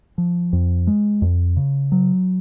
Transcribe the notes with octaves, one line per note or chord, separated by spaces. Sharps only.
F3
F2
G#3
F2
C#3
F#3